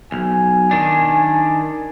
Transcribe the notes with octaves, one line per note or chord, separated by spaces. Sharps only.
B1 G#5
D#3 D4